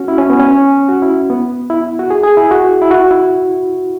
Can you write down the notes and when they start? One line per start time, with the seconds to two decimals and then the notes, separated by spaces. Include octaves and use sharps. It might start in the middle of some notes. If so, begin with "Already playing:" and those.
Already playing: C#4 F#4
0.08 E4
0.18 C#4
0.30 B3
0.40 C#4
0.89 F#4
1.02 E4
1.30 B3
1.70 E4
1.99 F#4
2.10 G#4
2.24 G#4
2.37 E4
2.51 F#4
2.82 E4
2.91 F#4
3.11 E4